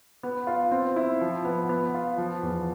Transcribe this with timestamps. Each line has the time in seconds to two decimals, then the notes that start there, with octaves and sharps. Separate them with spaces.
0.23 B3
0.47 F4
0.72 C4
0.96 E4
1.21 F3
1.45 B3
1.69 B3
1.94 F4
2.18 F3
2.43 E2